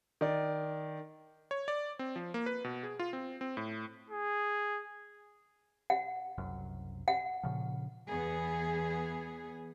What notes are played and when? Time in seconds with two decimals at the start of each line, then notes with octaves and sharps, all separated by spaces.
0.21 D#3 D5
1.51 C#5
1.68 D5
1.99 C4
2.16 F3
2.34 A#3
2.46 B4
2.64 B2
2.83 G#4
2.99 F4
3.13 C4
3.41 C4
3.57 A2
4.10 G#4
5.90 F#5
6.38 F#1 C2 F#2
7.08 F#5
7.43 A#2 C#3 F3
8.08 E2 B3 G#4